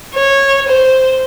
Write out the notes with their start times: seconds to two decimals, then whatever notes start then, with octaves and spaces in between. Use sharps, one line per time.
0.14 C#5
0.68 C5